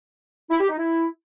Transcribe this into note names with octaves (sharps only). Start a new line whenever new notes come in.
E4
G4
D#4
E4